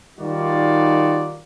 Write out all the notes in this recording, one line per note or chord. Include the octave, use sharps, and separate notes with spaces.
D#3 G3 D#4 F4 F#4 D5